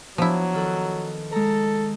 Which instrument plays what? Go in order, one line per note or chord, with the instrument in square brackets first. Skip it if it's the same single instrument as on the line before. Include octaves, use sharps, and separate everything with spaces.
[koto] F3 E4 [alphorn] F#3 [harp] B3 D4
[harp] D#3 A4 F#6
[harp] G#3 A#5 [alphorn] A4